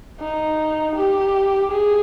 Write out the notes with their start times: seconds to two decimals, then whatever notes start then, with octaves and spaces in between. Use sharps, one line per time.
0.20 D#4
0.95 G4
1.72 G#4